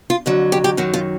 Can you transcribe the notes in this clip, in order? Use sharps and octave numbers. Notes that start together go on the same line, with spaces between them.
F4
F2 D3 F#3
G4
G4
F#2 D#3 F#3 F#4
F4